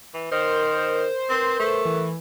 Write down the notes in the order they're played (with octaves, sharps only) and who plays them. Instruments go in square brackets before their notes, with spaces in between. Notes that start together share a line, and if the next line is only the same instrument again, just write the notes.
[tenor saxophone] E3
[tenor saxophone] D#3 [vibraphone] A#4 [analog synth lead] C5
[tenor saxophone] C4 [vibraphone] A#4 B4
[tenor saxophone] A3
[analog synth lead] E3